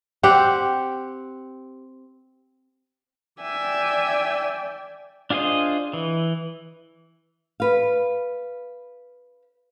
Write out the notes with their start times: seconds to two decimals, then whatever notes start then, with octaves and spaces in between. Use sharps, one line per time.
0.23 C4 G4 F#5
3.42 D5 E5 G5 G#5
5.30 D4 F4 G#4 C5 D#5
5.93 E3
7.60 B4 F5